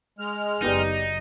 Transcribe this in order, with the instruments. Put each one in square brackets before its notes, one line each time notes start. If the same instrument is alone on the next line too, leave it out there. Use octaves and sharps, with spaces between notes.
[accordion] G#3 F6
[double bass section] F#1 [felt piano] B3 G4 D5 [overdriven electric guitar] D#4